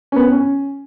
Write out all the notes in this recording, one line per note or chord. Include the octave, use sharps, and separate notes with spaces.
C#4
B3
C#4